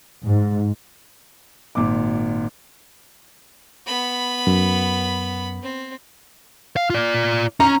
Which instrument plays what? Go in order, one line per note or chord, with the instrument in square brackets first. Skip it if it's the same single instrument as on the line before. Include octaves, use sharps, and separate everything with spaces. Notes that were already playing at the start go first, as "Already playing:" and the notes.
[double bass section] G#2
[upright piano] G#1 A#2 D6
[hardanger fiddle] B3 B5
[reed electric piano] F#2
[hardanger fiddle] C4
[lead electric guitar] F5
F4 D5
[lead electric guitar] C#4 [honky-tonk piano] A#5